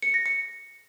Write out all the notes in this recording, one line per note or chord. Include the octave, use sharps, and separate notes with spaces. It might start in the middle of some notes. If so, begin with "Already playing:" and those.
C#7
A#6
C#7